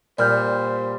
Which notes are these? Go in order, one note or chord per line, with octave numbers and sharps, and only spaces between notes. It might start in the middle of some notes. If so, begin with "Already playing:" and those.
A#2 G3 C5 D5 F6 G6